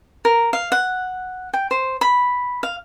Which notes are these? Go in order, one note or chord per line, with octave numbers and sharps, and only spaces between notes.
A#4
F5
F#5
G5
C5
B5
F5